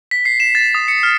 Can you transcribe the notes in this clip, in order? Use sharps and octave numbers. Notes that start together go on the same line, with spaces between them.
B6
C7
E7
A6
D#6
C#7
F6